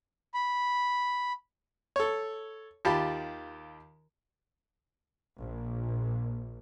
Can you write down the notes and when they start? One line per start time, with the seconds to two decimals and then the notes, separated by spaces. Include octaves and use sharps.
0.34 B5
1.96 A4 C#5
2.85 D#2 F4 G4 A5 B5
5.39 A#1